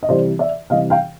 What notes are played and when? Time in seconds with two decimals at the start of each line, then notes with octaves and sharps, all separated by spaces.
0.03 D#5
0.09 C3 E3 G3 C5 D5
0.39 D5 E5
0.70 C3 E3 G3 D#5 F5
0.90 F5 G5